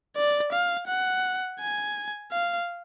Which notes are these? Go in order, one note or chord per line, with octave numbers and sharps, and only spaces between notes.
D5
F5
F#5
G#5
F5